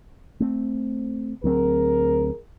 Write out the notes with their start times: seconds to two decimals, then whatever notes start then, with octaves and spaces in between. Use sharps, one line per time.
0.40 A3 C4
1.44 D2 F#3 C4 G#4 A#4